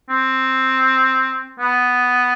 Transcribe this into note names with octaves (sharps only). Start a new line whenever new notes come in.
C4
B3